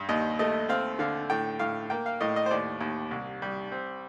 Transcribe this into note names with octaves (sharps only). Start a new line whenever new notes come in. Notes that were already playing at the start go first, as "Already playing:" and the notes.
Already playing: G2
D#2 D#5
A3 D#5
C4 F5
D3 F5
A2 G5
A2 F5
A#3 G5
F5
A2 D#5
D#5
C5
D#2 D5
D#2
C2
G3
C4